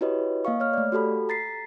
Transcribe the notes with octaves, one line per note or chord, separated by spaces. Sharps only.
E4 F#4 G4 B4 C#5 D#5
A#3 D#5 F5 C#6
C#5 F6
A3 D5
F#4 G4 A4 B5
A#5 A6 B6 C7